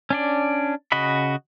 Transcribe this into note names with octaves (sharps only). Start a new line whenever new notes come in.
C#4 D4 D5
C#3 F#4 D#5 B5